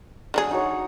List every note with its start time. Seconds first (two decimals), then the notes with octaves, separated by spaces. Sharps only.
0.34 D3 F#3 G#4
0.51 D#4 F#4 C#5